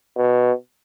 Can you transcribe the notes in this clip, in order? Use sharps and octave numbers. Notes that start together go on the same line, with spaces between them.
B2